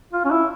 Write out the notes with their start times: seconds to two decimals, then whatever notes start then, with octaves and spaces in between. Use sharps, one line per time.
0.13 F4
0.25 C#4
0.31 E4